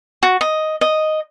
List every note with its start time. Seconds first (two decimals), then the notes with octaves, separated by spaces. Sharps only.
0.23 F#4
0.41 D#5
0.81 D#5